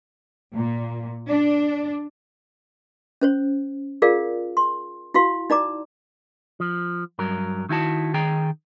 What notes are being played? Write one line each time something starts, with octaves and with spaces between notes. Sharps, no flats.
A#2
D4
C#4 C5 C#5
F4 G#4 A#4 D5 F5
C6
E4 F#4 F5 C6
D#4 D5 A#5 D6
F3
G2 F#3 A#4
D#3 E4 F#4 A5
D#3 G#4 G5 A#5